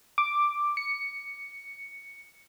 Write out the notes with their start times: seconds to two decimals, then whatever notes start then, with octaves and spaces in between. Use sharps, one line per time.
0.18 D6
0.77 C#7